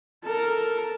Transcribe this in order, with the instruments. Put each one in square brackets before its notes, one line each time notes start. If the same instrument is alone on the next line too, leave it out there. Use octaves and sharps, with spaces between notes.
[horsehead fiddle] A4 A#4